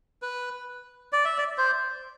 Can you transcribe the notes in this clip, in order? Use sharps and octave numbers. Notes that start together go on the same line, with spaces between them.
B4
D5
E5
D5
C5